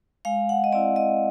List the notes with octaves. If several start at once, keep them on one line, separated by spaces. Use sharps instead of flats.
G#3 F5
F#5
D#5
C4 E4 D5
D#5